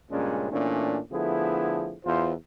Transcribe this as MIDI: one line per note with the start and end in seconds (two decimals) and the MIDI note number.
0.11 0.49 43
0.11 0.49 46
0.11 0.49 49
0.11 0.49 56
0.11 0.49 61
0.11 0.49 62
0.51 0.99 46
0.51 0.99 52
0.51 0.99 57
0.51 0.99 61
0.51 0.99 62
1.11 1.95 50
1.11 1.95 53
1.11 1.95 57
1.11 1.95 59
1.11 1.95 64
1.11 1.95 68
2.04 2.32 40
2.04 2.32 65
2.04 2.32 72